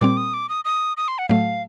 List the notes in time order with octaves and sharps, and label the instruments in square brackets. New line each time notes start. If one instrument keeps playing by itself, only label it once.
[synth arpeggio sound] A#2 G3 C4 [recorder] D6
[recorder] D#6
D6
D#6
D#6
D#6
C6
F#5
[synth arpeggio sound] A2 F#3 A3 [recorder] F5